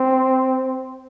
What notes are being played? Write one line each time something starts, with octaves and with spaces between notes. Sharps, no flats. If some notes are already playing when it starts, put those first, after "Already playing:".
Already playing: C4